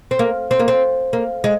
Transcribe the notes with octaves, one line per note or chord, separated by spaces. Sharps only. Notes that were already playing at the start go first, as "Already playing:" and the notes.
C4
A#3
C4
A#3
C4
A#3
G#3